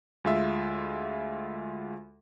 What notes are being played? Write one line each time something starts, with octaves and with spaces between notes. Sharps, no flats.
D2 G#3 F4 E5